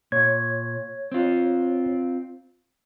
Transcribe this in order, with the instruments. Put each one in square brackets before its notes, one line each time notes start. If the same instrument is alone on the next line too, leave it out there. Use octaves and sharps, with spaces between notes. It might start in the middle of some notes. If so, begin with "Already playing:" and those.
[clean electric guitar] A#2 [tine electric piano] C#5 G#6
[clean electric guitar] C4 F4